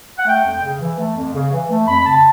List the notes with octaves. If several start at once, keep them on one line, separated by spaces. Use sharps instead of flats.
F#5
A3 G5
F2
C#3
E3
A3
F2
C#3
E3
A3
F2 B5
C#3 A5